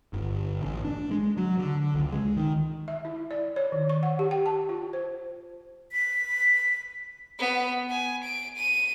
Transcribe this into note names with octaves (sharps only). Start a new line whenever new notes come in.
G1
A1
D4
G#3
F#3
D3
C#2
G#3
D#3
E5
E4
D5
C#5
D#3
C#6
F#5
G4
G5
A5
F4
C5
B6
B3
G#5
D7
D#7